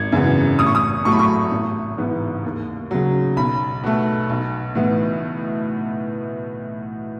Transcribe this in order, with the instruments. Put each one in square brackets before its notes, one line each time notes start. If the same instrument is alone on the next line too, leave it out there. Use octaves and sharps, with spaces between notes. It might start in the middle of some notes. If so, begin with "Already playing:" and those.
Already playing: [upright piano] G#1 G#6
F#2 C#3 E3 B3
A1 D#6
C#6
D#6
A2 F#3 A3 C#6
B5
C#6
A1
G#2 E3 B3
D#2
C#3 F#3
B1 B5
B2 A3
B1
A2 E3 B3